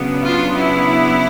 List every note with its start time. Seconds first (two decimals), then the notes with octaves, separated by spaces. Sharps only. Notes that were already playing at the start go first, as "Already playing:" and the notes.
Already playing: C#3 F#3 B3 D4
0.22 F4
0.57 E4